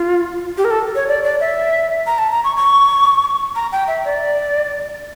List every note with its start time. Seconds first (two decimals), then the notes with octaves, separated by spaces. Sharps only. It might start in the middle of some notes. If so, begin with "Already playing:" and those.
Already playing: F4
0.58 G4
0.65 A#4
0.71 A4
0.95 C#5
1.08 D5
1.24 D5
1.40 E5
2.07 A#5
2.19 A5
2.32 A#5
2.44 C#6
2.57 C#6
3.55 A#5
3.72 G5
3.88 E5
4.05 D5